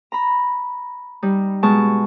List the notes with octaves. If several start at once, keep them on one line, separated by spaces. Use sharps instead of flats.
A#5 B5
G3 D#4
B2 G#3 A5 C#6